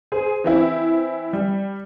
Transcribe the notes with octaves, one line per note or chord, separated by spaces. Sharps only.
G#4 C5
E3 C4 E4
G3